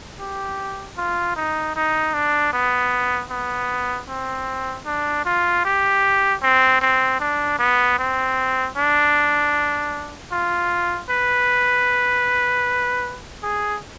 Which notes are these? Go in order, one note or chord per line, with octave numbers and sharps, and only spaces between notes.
G4
F4
D#4
D#4
D4
B3
B3
C4
D4
F4
G4
C4
C4
D4
B3
C4
D4
F4
B4
G#4